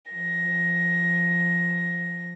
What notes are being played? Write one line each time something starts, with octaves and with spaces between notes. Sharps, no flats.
F3 A#6